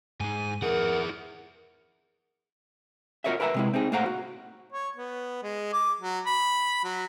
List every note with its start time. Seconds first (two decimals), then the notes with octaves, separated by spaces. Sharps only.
0.21 G#2 G#3 G#5
0.62 E4 G#4 A#4 F#5
3.24 F4 F#4 A#4 C#5 D#5 E5
3.40 A#4 B4 E5 G5 A#5
3.54 C3 G#3 E4
3.74 C4 D#4 G#4
3.92 A2 A#3 C5 F5 F#5 A#5
4.06 F#4
4.72 C#5
4.97 B3
5.43 G#3
5.73 D6
6.01 F#3
6.26 B5
6.84 F#3